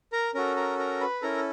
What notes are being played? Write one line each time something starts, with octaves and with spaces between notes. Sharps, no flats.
A#4 A#5
C#4 F#4 A4 A#4 A#5
A#4 A#5
A#4 A#5
B4 B5
C#4 E4 A4 A#4 A#5